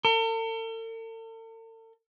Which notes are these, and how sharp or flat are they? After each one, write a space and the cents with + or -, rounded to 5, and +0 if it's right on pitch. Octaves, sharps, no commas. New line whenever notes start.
A4 +45